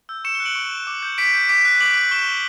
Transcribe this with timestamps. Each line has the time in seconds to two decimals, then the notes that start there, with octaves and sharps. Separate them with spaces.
0.09 E6 G6
0.24 C#6 C#7 E7
0.35 E7 G7
0.40 F#6
0.45 D7 F#7
0.55 C#6
0.71 F#6
0.87 D6
1.03 G6
1.18 D6 B6 D7
1.34 G6
1.49 D6 B6 D7
1.65 F#6
1.81 D6 D7 F#7
1.96 F#6
2.11 C#6 E7 G7
2.28 G6